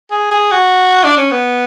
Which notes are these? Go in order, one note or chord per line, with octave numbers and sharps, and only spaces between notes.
G#4
G#4
F#4
D4
C#4
B3